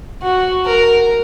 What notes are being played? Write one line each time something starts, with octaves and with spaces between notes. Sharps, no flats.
F#4
A#4